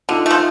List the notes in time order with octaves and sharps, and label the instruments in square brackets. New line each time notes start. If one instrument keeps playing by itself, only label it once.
[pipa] D3 [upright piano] D#4 F4
[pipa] F3 A3